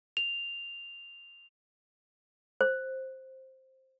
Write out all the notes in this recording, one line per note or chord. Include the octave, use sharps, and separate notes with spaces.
F7
C5